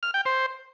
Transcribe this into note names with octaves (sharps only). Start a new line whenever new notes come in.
F6
G5
C5